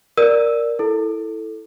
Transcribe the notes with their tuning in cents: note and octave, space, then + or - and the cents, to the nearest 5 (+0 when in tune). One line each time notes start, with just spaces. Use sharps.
A#4 +0 D5 +0 E6 +0
E4 -5 A4 +0